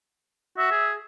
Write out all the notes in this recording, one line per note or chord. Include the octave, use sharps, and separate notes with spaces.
F#4 E5
G#4